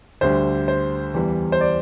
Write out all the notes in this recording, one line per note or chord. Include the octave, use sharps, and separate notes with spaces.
D2 D3 G3 C5
C5
E2 E3 G3
C5
D5